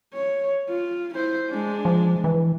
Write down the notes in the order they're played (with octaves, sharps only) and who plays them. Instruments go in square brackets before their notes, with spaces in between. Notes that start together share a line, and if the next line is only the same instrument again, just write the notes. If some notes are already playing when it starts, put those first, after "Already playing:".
[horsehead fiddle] C#5
F4
E4 C5
G#3 D4
[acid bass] F3
E3